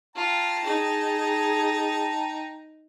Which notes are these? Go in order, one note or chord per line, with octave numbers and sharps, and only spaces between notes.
F4 G5 A5 A#5
D#4 G#4